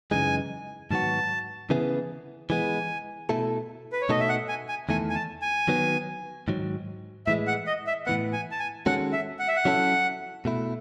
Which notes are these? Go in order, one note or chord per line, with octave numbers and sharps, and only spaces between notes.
F#2 C#3 E3 G#3 D#4 G#5
G#2 D#3 F#3 B3 F#4 A5
C#3 E3 B3 E4 G#4
E3 G#3 B3 G#5
B2 A3 E4 A4
B4
C#5
B2 A3 D#4 F#4 A4 D#5
E5
F#5
G#5
G#5
E2 D#3 A3 E4 A4 G#5
G#5
A5
G#5
D#3 F#3 B3
G#2 D#3 F#3
A2 E3 G#3 E5
F#5
D#5
E5
A2 E3 B3 F#5
G#5
A5
G#5
D#3 G#3 C#4 F#4 A4 F#5
E5
F#5
E5
F#5
F#3 C#4 E4 A4
B2 A3 E4